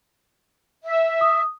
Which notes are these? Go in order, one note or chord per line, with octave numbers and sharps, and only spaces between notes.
E5
D#6